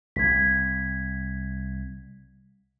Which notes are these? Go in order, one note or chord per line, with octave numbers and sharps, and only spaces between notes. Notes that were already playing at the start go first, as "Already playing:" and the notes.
C2 G#6 B6